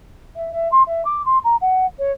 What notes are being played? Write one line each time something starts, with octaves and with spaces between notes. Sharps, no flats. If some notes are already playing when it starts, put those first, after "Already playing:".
E5
E5
C6
E5
D6
C6
A#5
F#5
C#5